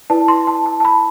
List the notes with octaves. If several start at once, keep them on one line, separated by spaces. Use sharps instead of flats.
E4 B4 D5 A5
C6
A5
A5
A5
B5